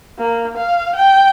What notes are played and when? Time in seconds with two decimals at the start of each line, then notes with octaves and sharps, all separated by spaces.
0.18 A#3
0.57 F5
0.95 G5